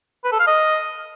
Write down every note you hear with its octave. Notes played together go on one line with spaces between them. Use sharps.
B4
A4
F5
D#5